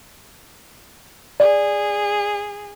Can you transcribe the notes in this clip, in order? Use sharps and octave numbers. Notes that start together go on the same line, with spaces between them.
G#4 D5